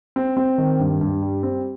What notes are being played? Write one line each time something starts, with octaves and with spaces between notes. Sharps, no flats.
C4
C4
D#3
G2
G2
G3
C4